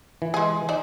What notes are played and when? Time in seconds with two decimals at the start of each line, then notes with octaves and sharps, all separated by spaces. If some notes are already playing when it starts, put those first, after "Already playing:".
0.22 E3
0.34 G#3 G#4
0.69 D#4 C5 D5